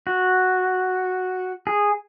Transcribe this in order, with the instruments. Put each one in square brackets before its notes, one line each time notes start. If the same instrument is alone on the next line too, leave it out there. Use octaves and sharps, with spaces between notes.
[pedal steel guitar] F#4
G#4